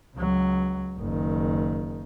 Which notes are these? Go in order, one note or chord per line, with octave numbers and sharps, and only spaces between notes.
C#2 F#3
F#1 D#3